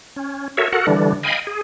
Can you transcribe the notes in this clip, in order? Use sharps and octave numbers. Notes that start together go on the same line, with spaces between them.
C#4
F#4 A4 A#4 C#5 E5
F#4 A4 A#4 F#5
D3 E3 G3 D4
D#5 F5 G5 G#5 B5
G#4